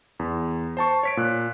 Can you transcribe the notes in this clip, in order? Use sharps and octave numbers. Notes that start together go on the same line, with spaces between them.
E2
C5 A5 C#6
C#5 B6 D7
A#2 F#6